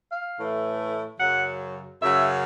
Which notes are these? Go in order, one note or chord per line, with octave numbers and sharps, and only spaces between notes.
F5
A2 E3 A3
F#2 C#3 F#3 F#5
F#2 C#3 F#3 E5